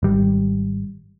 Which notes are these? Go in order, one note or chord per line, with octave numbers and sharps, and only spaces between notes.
G#1 G3